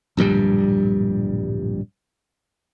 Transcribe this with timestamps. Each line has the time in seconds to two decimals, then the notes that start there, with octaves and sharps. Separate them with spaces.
0.17 D1 A#1 G2 G3